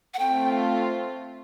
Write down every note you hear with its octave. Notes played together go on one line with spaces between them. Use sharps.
F#5
A3 C4 F4 G5